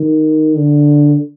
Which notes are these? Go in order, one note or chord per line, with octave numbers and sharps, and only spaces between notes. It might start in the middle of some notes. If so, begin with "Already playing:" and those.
Already playing: D#3
D3